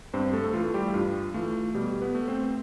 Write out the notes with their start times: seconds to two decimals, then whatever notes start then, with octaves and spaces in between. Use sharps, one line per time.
0.14 G2 C4 C5
0.33 A3 A4
0.53 E3 A3 F4
0.74 G3 G4
0.88 E4
0.94 G2 F4
1.34 E3 A3 F4
1.74 B2 G3 G4
2.01 B3 B4
2.15 A3
2.28 C4 C5